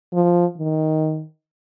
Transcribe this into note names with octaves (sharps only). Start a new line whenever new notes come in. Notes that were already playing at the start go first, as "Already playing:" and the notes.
F3
D#3